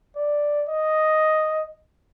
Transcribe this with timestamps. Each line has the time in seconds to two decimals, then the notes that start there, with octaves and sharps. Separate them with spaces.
0.16 D5
0.69 D#5